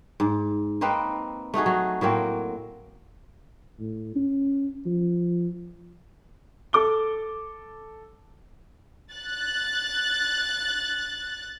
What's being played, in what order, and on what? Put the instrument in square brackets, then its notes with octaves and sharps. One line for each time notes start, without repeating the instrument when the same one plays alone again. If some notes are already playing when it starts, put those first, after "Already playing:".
[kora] G#2
A#3 C4 D#4 B4
A3 D#4 F#4 G#4
F#3
A2 F#3 A#3 C4
[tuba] A2
C#4
F3
[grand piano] A4 D6 G7
[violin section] F#6 A6